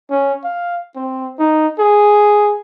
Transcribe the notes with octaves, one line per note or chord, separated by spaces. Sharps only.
C#4
F5
C4
D#4
G#4